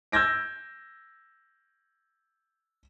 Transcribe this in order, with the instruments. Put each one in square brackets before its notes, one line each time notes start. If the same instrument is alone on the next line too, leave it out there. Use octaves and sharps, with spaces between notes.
[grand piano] E6 G6 G#6 A#6 D7